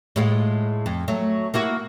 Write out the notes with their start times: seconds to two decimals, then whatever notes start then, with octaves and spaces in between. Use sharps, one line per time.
0.16 A2 G#3 F4
0.86 F2
1.08 F#3 A3
1.54 A#3 E4 F#4